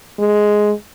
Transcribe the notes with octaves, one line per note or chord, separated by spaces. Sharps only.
G#3